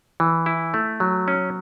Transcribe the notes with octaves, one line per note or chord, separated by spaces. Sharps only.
E3
E4
A3
F#3
C#4